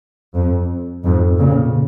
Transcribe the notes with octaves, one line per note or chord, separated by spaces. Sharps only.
F2
F2 G#2
A#2 C#3